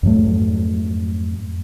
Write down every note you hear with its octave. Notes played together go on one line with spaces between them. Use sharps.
F2 G#2 F#3 A3